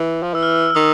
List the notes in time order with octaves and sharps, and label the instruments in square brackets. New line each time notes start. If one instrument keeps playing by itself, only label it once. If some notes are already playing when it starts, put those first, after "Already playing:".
Already playing: [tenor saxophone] E3
F3
[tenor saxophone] E3 [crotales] E6
[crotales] F6
E6
E6
[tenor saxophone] D#3 [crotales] D#6